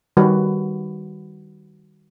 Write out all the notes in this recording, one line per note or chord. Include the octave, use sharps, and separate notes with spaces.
D#3 G3 F#4 B4